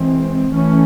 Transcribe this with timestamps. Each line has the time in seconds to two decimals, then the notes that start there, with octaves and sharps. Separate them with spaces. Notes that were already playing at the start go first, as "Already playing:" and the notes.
Already playing: E3 G#3 C4
0.50 E3 A3 C#4